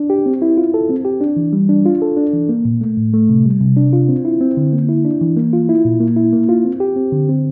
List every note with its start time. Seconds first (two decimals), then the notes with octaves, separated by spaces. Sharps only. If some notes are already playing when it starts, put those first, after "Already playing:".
Already playing: D4
0.10 G4
0.26 C4
0.42 E4
0.57 F4
0.74 A4
0.89 C4
1.05 G4
1.21 D4
1.37 E3
1.53 G3
1.69 D4
1.86 F4
2.02 A4
2.17 D4
2.33 E3
2.49 A#3
2.65 A#2
2.81 A3
2.97 A2
3.13 A3
3.29 C3
3.45 G3
3.61 C3
3.77 D4
3.93 F4
4.09 C4
4.25 E4
4.41 C4
4.57 D3
4.72 A#3
4.89 E4
5.05 D4
5.21 E3
5.37 A#3
5.53 F4
5.69 E4
5.85 A#2
6.00 A#3
6.16 E4
6.33 A#3
6.49 F4
6.64 C4
6.80 G4
6.96 C4
7.12 D3
7.29 C4